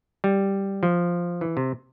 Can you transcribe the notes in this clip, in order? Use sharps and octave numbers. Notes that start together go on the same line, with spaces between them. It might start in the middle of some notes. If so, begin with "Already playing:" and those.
G3
F3
E3
C3